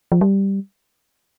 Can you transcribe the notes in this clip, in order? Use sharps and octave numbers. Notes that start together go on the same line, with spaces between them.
F3
G3